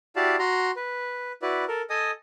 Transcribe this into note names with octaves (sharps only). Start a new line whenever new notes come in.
E4 F#4 G4 D5 F5 A5
F#4 A#5 C6
B4
E4 F#4 B4 D5
A4 A#4
A4 D#5 G#5 D#6